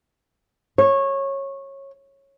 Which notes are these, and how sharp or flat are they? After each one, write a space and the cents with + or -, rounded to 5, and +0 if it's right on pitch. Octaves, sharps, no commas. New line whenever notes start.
C#5 -20